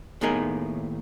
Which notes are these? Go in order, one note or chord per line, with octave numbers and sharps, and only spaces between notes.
D#2 A2 B3 D#4 G#4 A#4